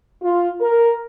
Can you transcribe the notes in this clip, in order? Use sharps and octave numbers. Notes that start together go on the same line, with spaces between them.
F4
A#4